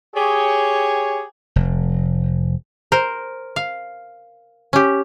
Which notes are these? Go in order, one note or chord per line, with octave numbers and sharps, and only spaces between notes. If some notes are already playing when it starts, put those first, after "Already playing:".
G4 G#4 C#5
F1
A#4 C5
F5
C#4 G4